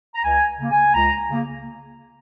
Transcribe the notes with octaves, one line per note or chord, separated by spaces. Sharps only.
A#5
C#2 G#5
C#3 A#3
G#5
C#2 A#5
C#3 A#3